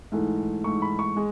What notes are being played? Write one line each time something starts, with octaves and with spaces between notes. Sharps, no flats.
G#2 E3 A3
G#2 E3 A3 C#6
B5
C#6
G#3